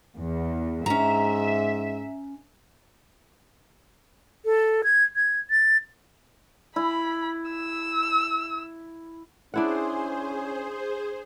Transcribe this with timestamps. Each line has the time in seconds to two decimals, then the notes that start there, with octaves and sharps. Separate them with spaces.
0.16 E2
0.86 G#2 C#4 E5 A#5
4.45 A4
4.84 G#6
5.16 G#6
5.50 A6
6.76 E4 B5
7.51 E6
9.54 C#4 D4 E4 G#4 C5 F#5